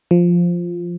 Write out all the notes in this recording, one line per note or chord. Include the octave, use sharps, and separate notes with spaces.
F3